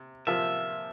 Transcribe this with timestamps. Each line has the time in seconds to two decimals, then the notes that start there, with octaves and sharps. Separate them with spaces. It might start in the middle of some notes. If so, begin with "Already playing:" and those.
Already playing: C3
0.27 C3 F3 A#3 F4 E5